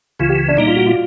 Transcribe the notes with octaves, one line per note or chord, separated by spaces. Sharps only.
C#2 C#3 E3 F4
G4
D4
A#2 G3 A#3 D#4
F4
F#4
F4